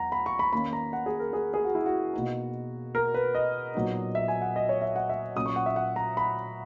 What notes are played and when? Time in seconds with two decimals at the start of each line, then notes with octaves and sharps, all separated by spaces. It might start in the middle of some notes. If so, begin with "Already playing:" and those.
Already playing: E2 F#3 F#5 A#5
0.12 B5
0.26 C#6
0.39 B5
0.53 D#3 A#3 C#4 B5
0.73 A#5
0.93 F#5
1.06 G#4
1.20 A#4
1.33 G#4
1.54 G#4
1.64 F#4
1.75 E4
1.86 F#4
2.13 B2 A#3 D#4
2.95 A#4
3.14 B4
3.35 D#5
3.75 A#2 F#3 B3 D#4
4.15 E5
4.28 G#5
4.42 F#5
4.56 D#5
4.69 C#5
4.82 E5
4.96 F#5
5.09 E5
5.36 A#2 F#3 C#4 D#6
5.46 C#6
5.56 F#5
5.66 E5
5.76 F#5
5.96 A#5
6.17 B5